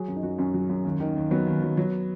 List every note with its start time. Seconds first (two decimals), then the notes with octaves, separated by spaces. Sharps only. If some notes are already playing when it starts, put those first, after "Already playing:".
Already playing: F#3 G#4
0.08 F#2
0.16 D#4
0.23 F#2 F#4
0.38 F#2 C#4
0.54 F#3
0.69 F#2
0.85 D#2
1.00 D#3
1.16 D#2
1.31 F#3 B3
1.46 D#2
1.62 F#3
1.77 F#3